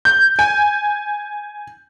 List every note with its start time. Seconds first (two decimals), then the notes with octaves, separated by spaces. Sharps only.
0.05 G6
0.39 G#5